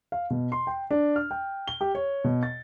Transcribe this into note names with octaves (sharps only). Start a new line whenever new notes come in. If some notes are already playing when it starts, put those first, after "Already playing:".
F5
B2
C6
G5
D4
F6
G5
G7
G4
C#5
B2
A6